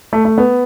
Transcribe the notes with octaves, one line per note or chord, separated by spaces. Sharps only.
A3
A3
B3